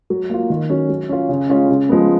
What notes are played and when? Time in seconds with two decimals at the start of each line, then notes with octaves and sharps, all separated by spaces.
0.10 F#3
0.29 A#3 F4
0.50 D#3
0.70 F#3 C#4
0.89 F#3
1.09 C#4 F4
1.29 C#3
1.49 G#3 C#4 F4
1.69 C#3
1.89 F3 G#3 B3